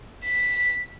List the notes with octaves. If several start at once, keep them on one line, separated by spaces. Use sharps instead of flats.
B6